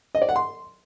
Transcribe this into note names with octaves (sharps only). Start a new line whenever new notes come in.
D#5
D5
F#5
C6